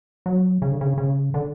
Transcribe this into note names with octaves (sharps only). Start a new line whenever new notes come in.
F#3
C#3
D3
C#3
C#3
D3